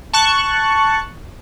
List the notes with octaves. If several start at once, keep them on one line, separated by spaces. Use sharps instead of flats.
A5 C#6 F#6